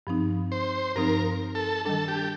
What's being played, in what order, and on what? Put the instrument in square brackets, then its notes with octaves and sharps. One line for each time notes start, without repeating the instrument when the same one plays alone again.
[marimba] G2 F3 C4 D#4
[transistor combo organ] C5
[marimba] G2 F3 C4 D#4 [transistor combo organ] A#4
[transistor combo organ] A4
[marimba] D#3 G3 D4 [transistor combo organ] A4
[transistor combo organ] G4